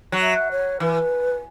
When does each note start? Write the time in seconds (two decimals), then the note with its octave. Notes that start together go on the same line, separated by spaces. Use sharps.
0.12 F#3
0.22 E5
0.51 C#5
0.80 E3 B4